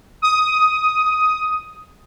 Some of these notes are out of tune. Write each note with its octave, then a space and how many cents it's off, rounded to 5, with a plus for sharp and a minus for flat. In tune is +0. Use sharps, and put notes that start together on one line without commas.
D#6 +10